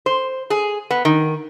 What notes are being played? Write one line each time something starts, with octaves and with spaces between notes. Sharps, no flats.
C5
G#4
B3
D#3